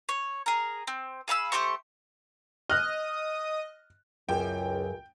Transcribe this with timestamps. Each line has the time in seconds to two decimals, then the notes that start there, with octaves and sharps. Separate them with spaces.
0.09 C#5
0.46 G#4 A#4
0.87 C4
1.28 G#4 F5 B5 E6
1.52 A3 G4 C5 C#6
2.70 D#5 F6 F#6
4.29 C#2 F#2 G5